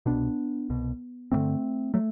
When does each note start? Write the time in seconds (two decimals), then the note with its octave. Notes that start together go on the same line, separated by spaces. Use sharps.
0.06 C2 B2 B3 D4
0.70 C2 B2
1.32 A1 G2 D3 A3 C4
1.94 F#3 A3